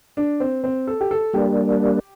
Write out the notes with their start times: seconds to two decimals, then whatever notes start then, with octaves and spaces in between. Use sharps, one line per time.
0.17 D4
0.40 C4
0.64 C4
0.87 A4
1.01 G4
1.11 A4
1.33 G3 A#3 D4 G4